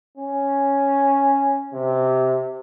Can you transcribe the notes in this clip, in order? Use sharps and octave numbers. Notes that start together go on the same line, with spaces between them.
C#4
C3